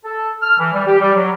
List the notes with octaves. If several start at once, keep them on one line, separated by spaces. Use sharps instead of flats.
A4
F6
E3
G3
G4
G3
F#3